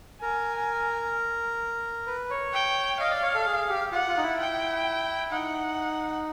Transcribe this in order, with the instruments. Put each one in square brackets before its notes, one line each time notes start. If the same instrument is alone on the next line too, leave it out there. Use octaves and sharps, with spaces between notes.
[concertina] A#4 [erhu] G#5
[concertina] B4
C#5
[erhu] G5
[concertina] D#5 [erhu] F5
[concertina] D5
C#5
A4
G#4
G4
[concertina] F4 [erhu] F#5
[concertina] F4
D#4
E4
[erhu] G5
[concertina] D#4 [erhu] F#5